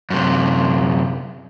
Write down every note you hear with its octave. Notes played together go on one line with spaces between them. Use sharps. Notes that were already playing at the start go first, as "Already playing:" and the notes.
F#2 C3